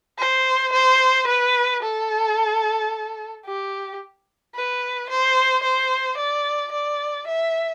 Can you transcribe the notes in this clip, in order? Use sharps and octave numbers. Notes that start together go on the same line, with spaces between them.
C5
C5
B4
A4
G4
B4
C5
C5
D5
D5
E5